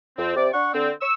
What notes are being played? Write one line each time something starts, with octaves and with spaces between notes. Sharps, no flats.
F2 C4
C3 D5
D4 F#5 C#6
D3 C4
C#6 E6